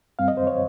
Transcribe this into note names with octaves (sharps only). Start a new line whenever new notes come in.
G2 G3 C4 F5
D#5
C5
C#5